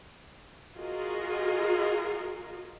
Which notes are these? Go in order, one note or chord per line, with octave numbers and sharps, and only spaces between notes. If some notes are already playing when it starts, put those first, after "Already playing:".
F4 F#4 G#4 A#4 D#5